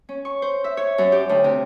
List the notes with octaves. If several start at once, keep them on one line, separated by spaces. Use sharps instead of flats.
C#4
C#6
C5
E5
C#5
F#2
G4
D2
C3